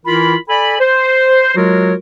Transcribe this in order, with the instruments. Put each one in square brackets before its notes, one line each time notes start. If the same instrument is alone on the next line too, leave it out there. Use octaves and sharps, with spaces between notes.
[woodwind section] E3 E4 F4 A#4 B5
A4 D5 G#5 B5
C5
F#3 G#3 F4 F#4 A#4 C#5